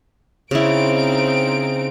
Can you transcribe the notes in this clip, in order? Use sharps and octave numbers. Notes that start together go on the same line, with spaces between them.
C#3 C4 D#4 E4 D7